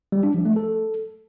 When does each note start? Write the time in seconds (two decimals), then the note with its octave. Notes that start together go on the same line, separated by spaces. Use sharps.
0.12 G3
0.23 D4
0.34 F3
0.45 A3
0.56 A4